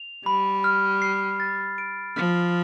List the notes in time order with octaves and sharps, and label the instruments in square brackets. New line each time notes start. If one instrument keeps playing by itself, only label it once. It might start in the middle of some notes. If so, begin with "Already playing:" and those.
Already playing: [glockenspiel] F7
[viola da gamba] G3 [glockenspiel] B5
[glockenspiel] F6
C7
A6
D7
[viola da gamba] F3 [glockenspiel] F6